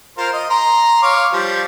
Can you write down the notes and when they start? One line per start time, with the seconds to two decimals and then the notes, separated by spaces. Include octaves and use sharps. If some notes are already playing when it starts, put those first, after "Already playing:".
0.18 F4 A#4 C5
0.33 D#5
0.50 A#5 C6
1.02 C#5 F5 D6
1.32 F3 G3